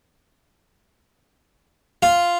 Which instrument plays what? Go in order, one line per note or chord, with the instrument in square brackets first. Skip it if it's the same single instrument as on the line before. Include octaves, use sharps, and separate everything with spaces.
[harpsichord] F4